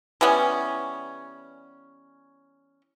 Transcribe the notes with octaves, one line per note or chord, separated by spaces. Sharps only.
E3 G3 B3 C#4